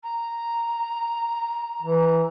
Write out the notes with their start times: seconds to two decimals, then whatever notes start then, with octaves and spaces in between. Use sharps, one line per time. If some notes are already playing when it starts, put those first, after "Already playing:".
0.03 A#5
1.82 E3